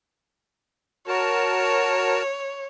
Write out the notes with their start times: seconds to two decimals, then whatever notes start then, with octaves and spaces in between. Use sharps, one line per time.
1.08 F#4 A#4 C#5 A5